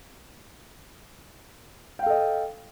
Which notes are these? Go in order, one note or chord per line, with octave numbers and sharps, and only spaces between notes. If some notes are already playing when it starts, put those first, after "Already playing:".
A4 D#5 F5 G5